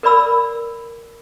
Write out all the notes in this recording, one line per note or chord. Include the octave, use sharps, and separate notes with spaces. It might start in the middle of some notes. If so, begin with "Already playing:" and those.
A#4 B4 D5 B5 E6